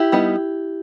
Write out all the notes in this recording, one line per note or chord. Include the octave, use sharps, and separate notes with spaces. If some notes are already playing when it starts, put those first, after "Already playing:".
Already playing: E4 G4
G3 B3 D#4